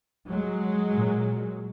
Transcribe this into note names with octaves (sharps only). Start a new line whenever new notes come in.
F#3 G#3
A#2